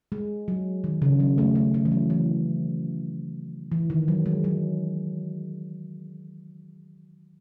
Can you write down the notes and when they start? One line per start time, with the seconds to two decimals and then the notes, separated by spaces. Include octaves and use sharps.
0.12 G#3
0.48 F#3
0.84 D#3
1.02 C#3
1.20 F#3
1.38 A3
1.55 A3
1.74 A3
1.85 E3
1.92 F#3
2.10 E3
3.72 E3
3.90 D#3
4.08 F#3
4.26 G#3
4.44 F#3